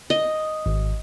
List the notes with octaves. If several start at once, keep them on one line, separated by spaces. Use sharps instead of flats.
D#5
G#1